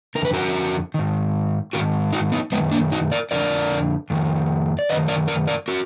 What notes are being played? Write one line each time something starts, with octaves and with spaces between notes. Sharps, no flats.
D3 A#4
F2 B4
F#4 A#4
G#2 D#3
G#2 D#3 F#4 A#4
D#4 F#4
B3 D#4
F#2 D#3 G#3 B3
A#3 D4
D#4 F#4
A#4 D5
F2 D3 A#4 D5
F2 D#3
D5
F#2 D#3 B4 D#5
A#4 D5
A#4 D5
A#4 D5
F#4 A#4